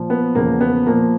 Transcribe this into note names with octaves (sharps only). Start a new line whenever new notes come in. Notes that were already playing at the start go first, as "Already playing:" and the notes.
Already playing: A#2 F3
B3
E2 C#3 F3 A#3
B3
A#2 F3 A#3